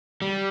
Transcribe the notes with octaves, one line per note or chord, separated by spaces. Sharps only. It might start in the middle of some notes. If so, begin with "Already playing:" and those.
G3